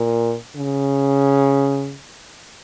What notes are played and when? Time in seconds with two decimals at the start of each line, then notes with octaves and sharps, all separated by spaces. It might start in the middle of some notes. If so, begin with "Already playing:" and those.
Already playing: A#2
0.56 C#3